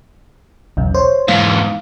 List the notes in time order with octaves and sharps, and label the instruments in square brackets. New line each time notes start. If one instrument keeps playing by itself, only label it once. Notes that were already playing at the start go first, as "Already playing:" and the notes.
[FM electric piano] B1 E2 C#3
C5 C#5
[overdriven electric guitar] E2 G#2 [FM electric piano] F5